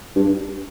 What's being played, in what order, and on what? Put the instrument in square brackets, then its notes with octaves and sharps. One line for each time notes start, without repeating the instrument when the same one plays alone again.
[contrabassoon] G2